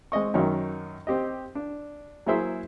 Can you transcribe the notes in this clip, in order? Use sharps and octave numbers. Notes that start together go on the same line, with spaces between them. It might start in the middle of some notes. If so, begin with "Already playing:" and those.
G#3 C4 D#5 C#6
F#2 D#3 F#3 C#4 D#4
C4 G4 D#5
D4
F#3 A#3 E4 G#4 C5 E5